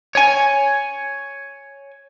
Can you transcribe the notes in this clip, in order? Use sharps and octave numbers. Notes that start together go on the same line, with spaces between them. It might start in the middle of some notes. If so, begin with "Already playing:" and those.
C#5 G#5